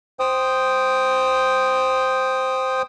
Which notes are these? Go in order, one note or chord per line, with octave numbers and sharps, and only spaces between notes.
C5 G5 D#6